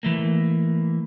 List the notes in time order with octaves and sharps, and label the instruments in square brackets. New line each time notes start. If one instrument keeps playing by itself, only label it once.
[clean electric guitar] E3 A3 A#3